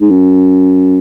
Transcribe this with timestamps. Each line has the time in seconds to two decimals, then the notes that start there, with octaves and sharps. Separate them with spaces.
0.01 G#2
0.10 F#2